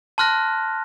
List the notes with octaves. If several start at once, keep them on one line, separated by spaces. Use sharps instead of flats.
A5 C6 F6 F#6 A#6